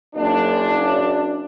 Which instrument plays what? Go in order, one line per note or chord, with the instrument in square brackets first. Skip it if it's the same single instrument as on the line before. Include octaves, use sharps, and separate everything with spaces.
[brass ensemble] F#1 D4